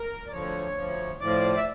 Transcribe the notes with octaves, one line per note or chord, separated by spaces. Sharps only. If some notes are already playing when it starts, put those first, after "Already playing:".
Already playing: A#4
D5
D2 D3 F3 C#5
D2 D3 F3
A2 F3 D5
E5